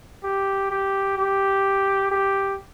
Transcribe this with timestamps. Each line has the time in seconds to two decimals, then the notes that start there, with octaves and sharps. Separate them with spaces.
0.23 G4
0.70 G4
1.18 G4
2.11 G4